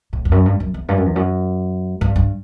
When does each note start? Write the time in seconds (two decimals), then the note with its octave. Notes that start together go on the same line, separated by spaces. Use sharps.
0.13 A2
0.25 E2
0.32 F#2
0.46 G2
0.60 F#2
0.74 E2
0.88 G2
0.97 F#2
1.06 E2
1.16 F#2
2.01 G2
2.16 G2